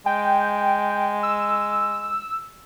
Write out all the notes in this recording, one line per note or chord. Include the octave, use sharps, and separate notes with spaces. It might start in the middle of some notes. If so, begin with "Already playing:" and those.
G#3 G5
E6